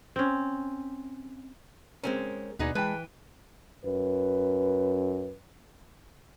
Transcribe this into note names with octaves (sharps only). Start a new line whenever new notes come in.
C4 C#4
G#3 C4 C#4 A#4
D#2 B2 B3 D#4 G#4 D5
E3 G#3 G#4 B4 G5 A5 B5
F#2 B4